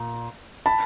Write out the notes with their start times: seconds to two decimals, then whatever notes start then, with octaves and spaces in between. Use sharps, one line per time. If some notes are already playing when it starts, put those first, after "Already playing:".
Already playing: A#2
0.66 A5 B5